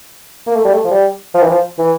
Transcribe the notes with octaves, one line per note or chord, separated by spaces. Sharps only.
A#3
A3
G3
A3
F3
G3
F3
E3
F3
E3